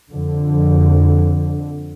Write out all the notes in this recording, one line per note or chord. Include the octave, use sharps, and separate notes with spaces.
F2 D3